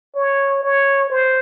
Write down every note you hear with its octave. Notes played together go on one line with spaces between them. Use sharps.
C#5
C#5
C5